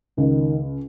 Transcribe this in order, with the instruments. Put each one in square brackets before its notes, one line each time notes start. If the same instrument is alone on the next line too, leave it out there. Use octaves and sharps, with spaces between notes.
[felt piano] C#2 [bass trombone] D#3